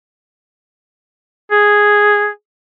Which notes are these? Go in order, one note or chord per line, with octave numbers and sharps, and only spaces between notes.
G#4